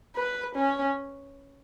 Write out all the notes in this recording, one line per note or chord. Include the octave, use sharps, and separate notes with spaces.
B4
C#4